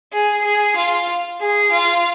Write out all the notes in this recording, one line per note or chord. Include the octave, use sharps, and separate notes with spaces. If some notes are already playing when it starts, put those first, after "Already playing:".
G#4
G#4
F4
G#4
F4